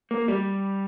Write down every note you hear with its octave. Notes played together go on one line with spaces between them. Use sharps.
A#3
G3